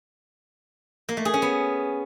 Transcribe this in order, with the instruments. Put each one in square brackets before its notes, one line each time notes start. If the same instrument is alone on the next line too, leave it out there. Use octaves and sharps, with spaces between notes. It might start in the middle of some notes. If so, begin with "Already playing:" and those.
[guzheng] A#3
A3
G#4
C#4
B3